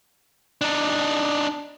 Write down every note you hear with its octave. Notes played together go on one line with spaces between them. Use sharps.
D4 D#4